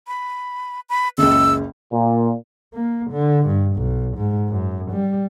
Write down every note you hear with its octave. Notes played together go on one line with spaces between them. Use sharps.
B5
B5
F#1 C#2 E6
A#2
A#3
D3
G2
B1
G#2
F#2
G3